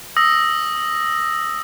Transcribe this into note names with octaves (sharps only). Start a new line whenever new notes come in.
D#6 E6 A#6